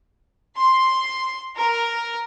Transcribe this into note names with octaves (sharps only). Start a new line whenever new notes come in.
C6
A#4